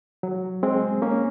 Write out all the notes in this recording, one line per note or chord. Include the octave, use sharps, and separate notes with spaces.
F#3
G#3 C4
A#3 C#4